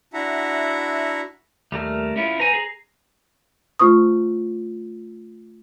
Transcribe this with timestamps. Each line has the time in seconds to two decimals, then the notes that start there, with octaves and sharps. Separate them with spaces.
0.13 D4 E4 F#4 E5 F#5 A#5
1.72 D#2 G3 A3 A#4
2.16 C#4 E4 F4
2.40 B4 C5 G#5 A#5
2.53 G#4
3.79 A3 F4 C5 C#6 D#6